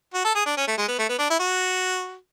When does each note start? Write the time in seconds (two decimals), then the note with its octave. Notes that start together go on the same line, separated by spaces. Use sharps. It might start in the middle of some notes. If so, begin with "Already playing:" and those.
0.14 F#4
0.24 A4
0.35 G#4
0.46 D4
0.57 C#4
0.67 A3
0.77 G#3
0.88 B3
0.98 A3
1.09 B3
1.19 D4
1.30 E4
1.39 F#4